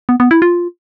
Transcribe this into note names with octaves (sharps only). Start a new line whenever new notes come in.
B3
B3
E4
F4